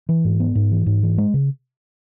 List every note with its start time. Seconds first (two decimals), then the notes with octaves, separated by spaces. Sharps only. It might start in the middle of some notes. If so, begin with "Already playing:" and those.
0.09 E3
0.24 G#2
0.40 B3
0.55 G#2
0.72 E3
0.86 G#2
1.03 E3
1.18 G#3
1.34 C#3